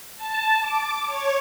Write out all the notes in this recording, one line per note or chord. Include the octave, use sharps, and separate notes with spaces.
A5
D6
C#5